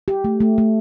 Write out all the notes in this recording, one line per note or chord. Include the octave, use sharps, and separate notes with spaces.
G4
A3
A3
A3